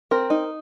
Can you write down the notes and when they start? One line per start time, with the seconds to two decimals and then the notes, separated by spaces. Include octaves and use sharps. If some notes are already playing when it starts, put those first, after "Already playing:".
0.11 C4 A#4
0.30 D#4